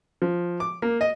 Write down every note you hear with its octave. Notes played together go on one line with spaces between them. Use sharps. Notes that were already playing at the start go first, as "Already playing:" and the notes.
F3
D6
A#3
D#5